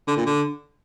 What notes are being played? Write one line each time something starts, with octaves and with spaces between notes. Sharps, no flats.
D3
A#2
D3